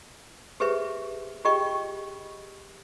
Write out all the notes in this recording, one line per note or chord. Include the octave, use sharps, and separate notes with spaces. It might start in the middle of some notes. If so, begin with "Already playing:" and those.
G4 G#4 B4 C5 E5
F4 G4 G#4 D#5 G5 C#6